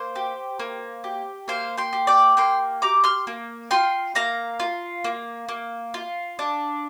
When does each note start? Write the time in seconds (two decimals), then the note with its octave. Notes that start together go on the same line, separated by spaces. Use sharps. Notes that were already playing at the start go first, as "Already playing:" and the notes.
Already playing: A#3 C5
0.15 G4
0.59 A#3
1.04 G4
1.48 A#3 C5 F5
1.78 G5 C6
1.93 G4
2.07 D5 G5
2.37 A#3 G5 C6
2.82 G4 A#5 D6
3.04 C6 F6
3.27 A#3
3.71 F4 G5 C6
4.15 A#3 F5 A#5
4.60 F4
5.04 A#3
5.49 A#3
5.94 F4
6.39 D4